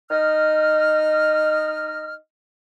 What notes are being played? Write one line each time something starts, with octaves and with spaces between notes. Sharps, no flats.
D#4 D#5 F6